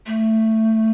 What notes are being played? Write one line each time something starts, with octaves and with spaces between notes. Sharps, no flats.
A3